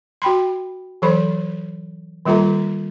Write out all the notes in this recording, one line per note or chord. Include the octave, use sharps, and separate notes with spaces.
F#4 G5 B5 C6
E3 F#3 A4 C5 B5
D#3 G3 A#3 F4 A4 A#5